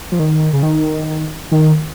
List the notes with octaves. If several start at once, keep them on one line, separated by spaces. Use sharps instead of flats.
F3
D#3
C#3
D#3
D#3